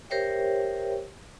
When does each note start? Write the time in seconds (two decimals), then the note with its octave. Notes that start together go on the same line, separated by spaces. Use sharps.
0.10 G4 A#4 C5 C#5 E5 G5